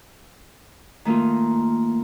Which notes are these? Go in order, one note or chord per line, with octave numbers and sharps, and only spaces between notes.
D#3 A3 A#3 D#4 F4